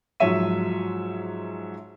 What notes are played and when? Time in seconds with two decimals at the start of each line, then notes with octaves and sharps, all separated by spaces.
0.20 G#2 F3 F#3 C#5 E5 D#7